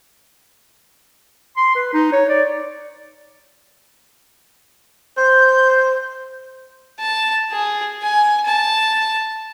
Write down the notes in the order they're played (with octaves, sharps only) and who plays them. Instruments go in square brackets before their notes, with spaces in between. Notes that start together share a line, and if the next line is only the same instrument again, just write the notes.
[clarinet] C6
B4
D#4
C#5
D5
[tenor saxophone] C5 [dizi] G6
[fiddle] A5
G#4
G#5
A5